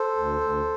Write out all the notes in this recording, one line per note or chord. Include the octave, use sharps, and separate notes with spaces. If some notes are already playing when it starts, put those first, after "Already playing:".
Already playing: A4 C5
D2
D2